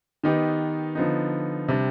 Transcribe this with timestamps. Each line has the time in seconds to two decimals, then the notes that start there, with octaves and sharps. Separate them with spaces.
0.23 D#3 B3 D#4 G4 B4
0.95 D3 F3 B3 D#4
1.68 C3 G3 D4